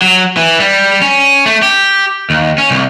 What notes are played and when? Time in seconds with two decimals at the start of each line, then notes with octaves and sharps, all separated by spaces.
0.02 F#3
0.37 E3
0.60 G3
1.02 C#4
1.46 A3
1.62 G4
2.30 D#2
2.58 C#4
2.71 C2